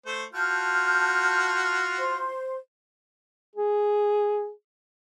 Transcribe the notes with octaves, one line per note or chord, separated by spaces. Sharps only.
A3 C5
F4 F#4 A5 F6 G6
C5 C6
G#4